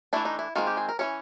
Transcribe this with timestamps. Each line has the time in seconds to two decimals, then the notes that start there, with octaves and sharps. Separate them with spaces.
0.13 E3 A3 D4 E4
0.25 D#4
0.39 E4
0.56 D#3 G#3 C4 F4
0.67 G4
0.77 G#4
0.89 A#4
0.99 E3 A3 C#4 C#5